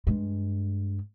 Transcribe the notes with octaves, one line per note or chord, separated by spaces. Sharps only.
G2 G#3